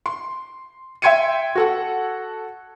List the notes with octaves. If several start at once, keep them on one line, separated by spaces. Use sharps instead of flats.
C6
E5 G5 C6 G#6 C#7 D#7
F#4 A4 F#5